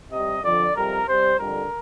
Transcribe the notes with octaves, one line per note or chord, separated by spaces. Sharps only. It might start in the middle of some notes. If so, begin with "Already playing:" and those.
C3 G3 D#5
F2 D3 F3 D5
F2 C3 G3 A#4
C3 G3 C5
F2 D3 G3 A#4